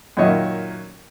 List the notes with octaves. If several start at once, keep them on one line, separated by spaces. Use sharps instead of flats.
F#2 A#2 D#3 C#5 D#5 E5